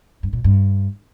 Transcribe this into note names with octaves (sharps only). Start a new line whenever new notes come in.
G2
A#2
G2